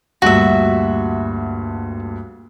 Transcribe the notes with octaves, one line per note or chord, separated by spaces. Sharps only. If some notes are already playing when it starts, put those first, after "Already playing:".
D2 G2 A#2 F#4 E5